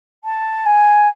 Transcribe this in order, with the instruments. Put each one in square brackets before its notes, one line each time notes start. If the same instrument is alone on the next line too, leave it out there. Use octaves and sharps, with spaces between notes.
[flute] A5
G#5